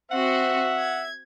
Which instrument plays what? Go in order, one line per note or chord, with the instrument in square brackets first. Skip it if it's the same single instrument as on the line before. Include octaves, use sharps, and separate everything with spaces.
[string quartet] C4 F#4 [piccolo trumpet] E5 [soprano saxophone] F#5
[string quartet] G#6